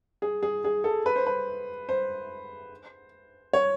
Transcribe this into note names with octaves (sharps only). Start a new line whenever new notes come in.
G#4
G#4
G#4
A4
B4
C5
B4
C5
C#5